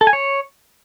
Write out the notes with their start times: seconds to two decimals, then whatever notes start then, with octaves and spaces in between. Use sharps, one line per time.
0.01 A4
0.07 G#5
0.13 C#5